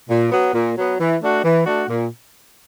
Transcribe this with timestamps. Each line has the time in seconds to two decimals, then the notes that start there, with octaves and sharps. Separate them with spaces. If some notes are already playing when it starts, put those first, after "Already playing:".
0.09 A#2
0.31 F#3 B3
0.53 A#2
0.76 F#3 B3
0.98 E3
1.21 A3 D4 F#4
1.44 E3
1.66 A3 D4 F#4
1.88 A#2